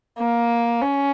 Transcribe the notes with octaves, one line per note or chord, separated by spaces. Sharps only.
A#3
C#4